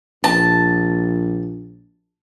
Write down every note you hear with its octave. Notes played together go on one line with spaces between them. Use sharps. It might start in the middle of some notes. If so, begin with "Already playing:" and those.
A#1 A5